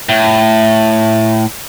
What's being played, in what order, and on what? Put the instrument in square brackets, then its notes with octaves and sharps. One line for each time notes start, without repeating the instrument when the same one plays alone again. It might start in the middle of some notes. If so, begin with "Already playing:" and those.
[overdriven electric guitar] A2